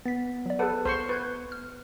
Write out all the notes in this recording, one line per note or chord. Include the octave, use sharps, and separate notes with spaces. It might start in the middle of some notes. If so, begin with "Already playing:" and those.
B3 A6 B6
F#3 D5
G#4 A4 B4 C5 F#5
C2 C5 C6 C#6
B4 C#6 G6 G#6
F6